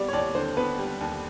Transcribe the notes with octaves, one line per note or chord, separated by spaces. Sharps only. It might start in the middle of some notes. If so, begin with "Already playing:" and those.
Already playing: G3 B3 D5
C#5
D#2 D5
D3 C5
B3 B4
G3
D#2